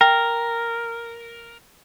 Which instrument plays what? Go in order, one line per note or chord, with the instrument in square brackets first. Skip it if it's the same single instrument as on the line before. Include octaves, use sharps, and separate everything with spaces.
[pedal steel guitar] A#4 [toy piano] G5